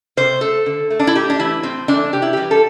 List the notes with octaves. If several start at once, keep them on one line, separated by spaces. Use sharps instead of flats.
C3 C5
A3 A4
D3
A3
D4
E4
A2 G4
D4
E3 A3 E4
A2 C4
E3 A3 D4
C3 G4
E4
E3 G3 G4
A4